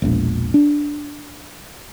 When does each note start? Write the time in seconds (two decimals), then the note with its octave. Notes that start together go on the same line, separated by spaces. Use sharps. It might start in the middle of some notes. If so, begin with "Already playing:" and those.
0.02 E1 A#1
0.54 D4